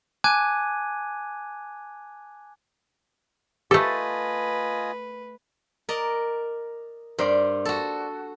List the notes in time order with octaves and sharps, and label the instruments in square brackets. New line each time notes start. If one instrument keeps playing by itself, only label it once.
[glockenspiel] G#5 A5 D6 F#6 G#6 D#7
[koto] A3 A4 [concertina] F4 D#5 G#5 [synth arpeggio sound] G4 [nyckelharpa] B4
[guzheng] A#4 D5 D#5
[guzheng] G2 [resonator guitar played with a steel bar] A#4 C5 D5
[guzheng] F#4 A4